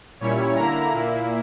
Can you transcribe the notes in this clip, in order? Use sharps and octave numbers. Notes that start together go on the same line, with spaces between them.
A#2 G3 C#4 E4 C#5
D3 A#3 E4 A#5
A#2 A#3 E4